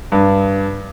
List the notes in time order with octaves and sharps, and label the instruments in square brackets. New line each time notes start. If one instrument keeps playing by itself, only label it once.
[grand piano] G2